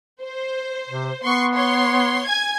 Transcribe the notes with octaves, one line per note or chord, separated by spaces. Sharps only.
C5
C3
B3 C6 C#6
C#5 C6
G#5 G#6